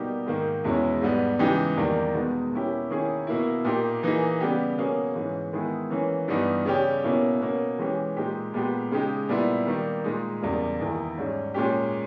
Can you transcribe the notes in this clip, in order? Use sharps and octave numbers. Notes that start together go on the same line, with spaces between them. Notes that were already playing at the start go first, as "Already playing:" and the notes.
Already playing: B2 G3 A#3 D#4 G4
G#2 D#3 A#3
E2 B2 G#3 C#4 E4
G#2 G3 B3
C#3 E3 G#3 D#4 G4
E2 D#3 G3 A#3
B2 G#3 B3 D#4
B2 A#3 C#4 E4 G4
D#3 A#3 C#4 E4 G#4
B2 A#3 E4
A#2 A#3 D#4 G4
E3 A#3 D#4 G#4
C#3 G3 B3 G4
B2 A#3 C#4 G#4
G#2 E3 G#3 C#4
D#3 G#3 B3 E4 G#4
E3 A#3 C#4
G2 E3 G3 B3 D#4
C#3 G3 C#4 G4
B2 A#3 C#4 E4
B2 A#3 C#4
E3 G#3 C#4 G4
A#2 G#3 D#4 G4
A#2 G#3 B3 G4
C#3 G#3 D#4 G4
A#2 G3 B3 E4
D#3 G3 A#3
A#2 G#3 D#4
E2 C#3 G3 A#3
E2 D#3 A#3 E4 G#4
G#2 G3 C#4
A#2 G#3 C#4 G4